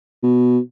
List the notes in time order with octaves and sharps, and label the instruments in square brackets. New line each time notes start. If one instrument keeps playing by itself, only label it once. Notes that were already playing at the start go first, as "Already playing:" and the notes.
[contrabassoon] B2